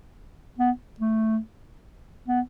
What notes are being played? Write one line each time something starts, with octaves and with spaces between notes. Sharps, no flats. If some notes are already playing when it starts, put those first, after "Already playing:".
B3
A3
B3